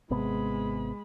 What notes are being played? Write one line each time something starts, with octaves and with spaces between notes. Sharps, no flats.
G#1 C3 G#3 B3 B5